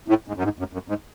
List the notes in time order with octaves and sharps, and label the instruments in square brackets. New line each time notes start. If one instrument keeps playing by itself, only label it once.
[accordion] A2
G#2
F#2
G#2
F#2
F#2
G#2